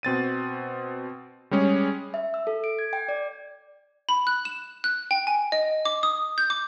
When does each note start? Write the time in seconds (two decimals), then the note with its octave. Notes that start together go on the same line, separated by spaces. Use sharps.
0.03 B2 C4 A6 D#7
1.51 G3 G#3 C#4 G#4
2.14 E5
2.34 E6
2.47 A4
2.64 D7
2.79 G#6
2.93 G5
3.08 D5
4.09 B5
4.27 F#6
4.45 E7
4.84 F#6
5.11 G5
5.27 G#5
5.52 D#5
5.85 D6
6.03 D#6
6.38 G6
6.50 D6